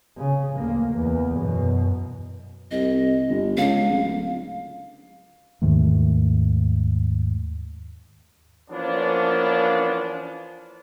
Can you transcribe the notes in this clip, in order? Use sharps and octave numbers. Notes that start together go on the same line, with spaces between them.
C#3
D2 A#3
E2
F#2 B2
C2 D#5
G1
C#2 F5
D1
D#2 G#2 D#3 A3
E3 F3 A#3 B3 C#4 D4